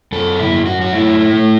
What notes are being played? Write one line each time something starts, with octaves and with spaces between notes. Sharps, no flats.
F#2 A4
E4
F#2
F#4
F#4
A3 E4
A3